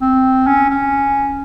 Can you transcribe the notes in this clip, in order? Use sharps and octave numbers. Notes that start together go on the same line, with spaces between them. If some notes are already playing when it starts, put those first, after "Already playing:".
C4
C#4
C#4